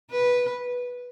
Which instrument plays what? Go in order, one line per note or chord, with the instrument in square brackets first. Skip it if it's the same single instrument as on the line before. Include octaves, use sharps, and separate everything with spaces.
[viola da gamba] B4